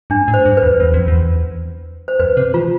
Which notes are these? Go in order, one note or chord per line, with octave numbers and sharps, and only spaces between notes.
G2 D4
A2
C5
G2
B4
E2
E2
F2
E2
C5
F2 B4
C3
E3 F4